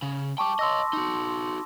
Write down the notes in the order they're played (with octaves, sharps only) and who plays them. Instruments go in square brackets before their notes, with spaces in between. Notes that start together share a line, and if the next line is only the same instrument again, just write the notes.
[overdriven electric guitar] C#3
[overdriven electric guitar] G3 G5 [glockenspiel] A5 C#6 D6
[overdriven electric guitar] C#5 D#5 [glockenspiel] C6 E6 A#6
[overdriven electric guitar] D#4 F#4